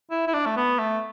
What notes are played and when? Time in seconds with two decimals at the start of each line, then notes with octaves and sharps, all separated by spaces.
0.11 E4
0.27 E4
0.34 D4
0.46 A3
0.57 B3
0.79 A3